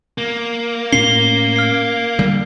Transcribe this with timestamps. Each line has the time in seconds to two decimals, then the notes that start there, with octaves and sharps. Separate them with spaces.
0.18 A#3
0.93 A2 C#4 C7 G7
1.56 F6 C7
2.19 D3 G3